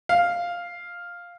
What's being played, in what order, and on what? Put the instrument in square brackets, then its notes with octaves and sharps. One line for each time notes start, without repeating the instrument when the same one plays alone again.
[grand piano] F5